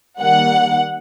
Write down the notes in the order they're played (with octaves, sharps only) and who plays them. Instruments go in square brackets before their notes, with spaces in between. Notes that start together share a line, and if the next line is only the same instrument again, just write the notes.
[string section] D#3 G3 A#3 F#5